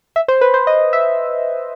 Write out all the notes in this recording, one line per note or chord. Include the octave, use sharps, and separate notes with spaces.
E5
C5
B4
C5
D#5
E5